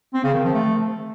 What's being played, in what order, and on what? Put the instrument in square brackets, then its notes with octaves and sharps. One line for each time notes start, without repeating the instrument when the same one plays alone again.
[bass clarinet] C4
C#3
D#3
F3
A3